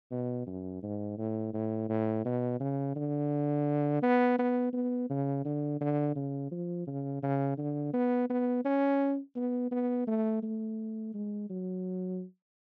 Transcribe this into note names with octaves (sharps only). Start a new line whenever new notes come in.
B2
F#2
G#2
A2
A2
A2
B2
C#3
D3
B3
B3
B3
C#3
D3
D3
C#3
F3
C#3
C#3
D3
B3
B3
C#4
B3
B3
A3
A3
G#3
F#3